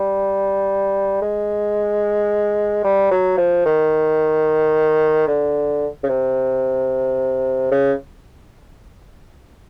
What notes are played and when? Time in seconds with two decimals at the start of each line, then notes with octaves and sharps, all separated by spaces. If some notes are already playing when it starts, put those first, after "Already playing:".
Already playing: G3
1.22 G#3
2.84 G3
3.11 F#3
3.38 F3
3.66 D#3
5.28 D3
6.04 C#3
6.09 C3
7.71 C#3